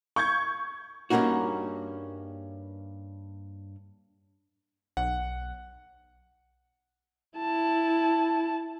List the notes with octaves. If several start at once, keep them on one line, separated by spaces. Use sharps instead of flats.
C#6 G6 G#6
G2 A#3 C4 C#4 D#4 F#4
B1 F#5
E4 A5